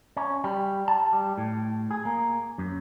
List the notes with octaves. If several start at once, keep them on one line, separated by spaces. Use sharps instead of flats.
C#4
G3
A5
G3
A2
G#4
A#3
F#2